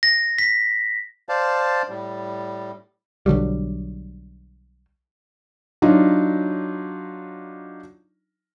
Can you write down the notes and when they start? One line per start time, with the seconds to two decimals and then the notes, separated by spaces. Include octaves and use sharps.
0.03 A#6
0.38 B6
1.29 C5 D5 F5 A5
1.89 A2 G3
3.26 B1 D3 F#3 G3
5.82 F#3 D4 D#4 F4